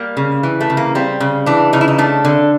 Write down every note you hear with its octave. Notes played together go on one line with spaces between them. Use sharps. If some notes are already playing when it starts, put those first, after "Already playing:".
Already playing: G3 A#3
C#3
E3
A3
C#3
A#3
G3 C4
C#3
E3 D4
C#3 D#4
E4
D#4
A3 D4
D3